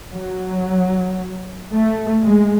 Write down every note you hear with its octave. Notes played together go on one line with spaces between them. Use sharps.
F#3
A3
G#3